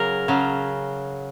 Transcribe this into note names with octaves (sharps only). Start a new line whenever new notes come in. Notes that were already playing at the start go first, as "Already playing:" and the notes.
Already playing: C#3 F#3 G#4 A#4
C#3 F#3